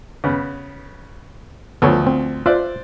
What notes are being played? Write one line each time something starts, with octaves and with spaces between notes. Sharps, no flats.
C#3 B3
D2 F3 B3 A4 C#5
C4
F4 C5 D5 E5 F#6